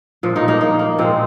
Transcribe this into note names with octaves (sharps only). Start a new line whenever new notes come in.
A#2 F3
A#3 D#4
A#3 D#4
A#3 D#4
A#3
A#2 F3 G#3 C4